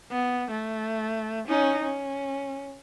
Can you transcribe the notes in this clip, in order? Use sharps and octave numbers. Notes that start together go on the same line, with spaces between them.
B3
A3
C#4 D#4
C#4